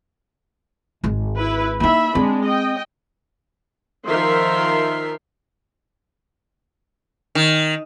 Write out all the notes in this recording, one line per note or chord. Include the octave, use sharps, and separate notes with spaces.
G#1 G#3
E4 B4
A#3 D#4 E4 E5 B5
G#3 C4 D4
D#5 G5
D#3 F3 A#4 E5 C6
D#3